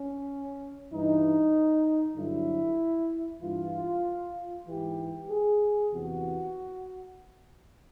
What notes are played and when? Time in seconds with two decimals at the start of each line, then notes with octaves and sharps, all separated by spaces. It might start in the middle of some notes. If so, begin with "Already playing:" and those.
Already playing: C#4
0.91 G2 E3 D#4
2.16 G2 D3 F#3 E4
3.41 G2 E3 F4
4.66 G#2 E3 G4
5.29 G#4
5.91 E2 C3 E3 F#4